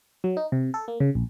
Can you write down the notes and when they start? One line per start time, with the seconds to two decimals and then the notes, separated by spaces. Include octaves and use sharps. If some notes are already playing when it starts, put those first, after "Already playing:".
0.24 F#3
0.37 D#4
0.52 C3
0.74 A4
0.88 A#3
1.00 C#3
1.15 A#1